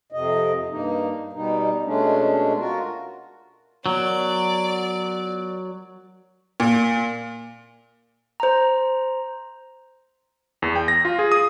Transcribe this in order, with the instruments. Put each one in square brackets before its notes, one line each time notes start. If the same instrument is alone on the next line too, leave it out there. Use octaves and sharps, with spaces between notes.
[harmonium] F2 C3 D#5
G2 A#3 D#4
B2 G3 D#4
B2 G#3 A3 C#4 D4
F4 F#4 A#4
[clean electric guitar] F#3 [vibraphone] B3 F4 A#4 [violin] D5
[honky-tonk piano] A#2
[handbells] C5 A#5
[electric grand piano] E2
G5
A#6
F4
G#4
D#6